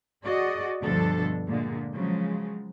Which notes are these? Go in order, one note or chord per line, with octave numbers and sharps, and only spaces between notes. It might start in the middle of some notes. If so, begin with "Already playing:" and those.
F#4 G#4 D5 D#5
D2 G2 B2 F3 D4 A4
A#2 D3 G#3
C#3 F3 F#3 G#3